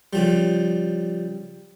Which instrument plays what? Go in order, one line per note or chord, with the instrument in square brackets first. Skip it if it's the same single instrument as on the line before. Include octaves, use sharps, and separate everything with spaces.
[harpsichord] C#3 F3 G3